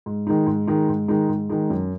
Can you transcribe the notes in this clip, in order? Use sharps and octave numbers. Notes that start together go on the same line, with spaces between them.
G#2
D#3 G#3 D#4
G#2
D#3 G#3 D#4
G#2
D#3 G#3 D#4
G#2
D#3 G#3 D#4
F#2